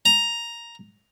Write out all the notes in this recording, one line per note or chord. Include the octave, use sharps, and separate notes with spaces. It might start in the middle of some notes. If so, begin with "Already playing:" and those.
A#5